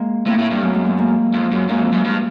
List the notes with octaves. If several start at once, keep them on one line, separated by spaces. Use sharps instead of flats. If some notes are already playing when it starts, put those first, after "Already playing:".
Already playing: G#3 A#3
A2 A#3 C4
A2
G2
F#2 A3 B3
G#3 A#3
A3 B3
G#3 A#3
F2
F#2
F#2 G#3 A#3
F2
F#2
G2